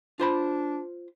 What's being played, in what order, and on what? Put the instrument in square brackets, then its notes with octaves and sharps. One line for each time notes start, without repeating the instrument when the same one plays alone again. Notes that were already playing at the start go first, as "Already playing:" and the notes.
[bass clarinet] D4 [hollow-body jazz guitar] F4 C5 B5